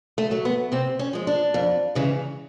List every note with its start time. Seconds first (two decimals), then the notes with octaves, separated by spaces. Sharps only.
0.18 A3
0.31 F#3 A3
0.45 B3
0.72 C3 C4
0.99 C#4
1.13 F3 G#3
1.27 D4
1.54 F2
1.95 C#3 E3 G#3